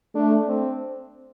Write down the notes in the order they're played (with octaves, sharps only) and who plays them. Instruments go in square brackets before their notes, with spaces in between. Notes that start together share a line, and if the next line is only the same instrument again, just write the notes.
[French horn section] A3 [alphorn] D4
[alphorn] C4